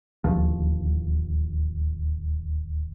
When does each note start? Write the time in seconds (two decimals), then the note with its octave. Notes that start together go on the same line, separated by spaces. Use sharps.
0.24 D1 D#2 F3